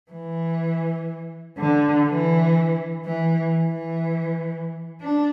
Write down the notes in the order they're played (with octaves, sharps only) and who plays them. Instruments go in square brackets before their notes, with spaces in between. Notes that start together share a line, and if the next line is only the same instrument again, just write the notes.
[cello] E3
D3
E3
E3
E3
D4